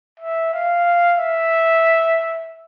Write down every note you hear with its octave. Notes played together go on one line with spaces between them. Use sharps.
E5
F5
E5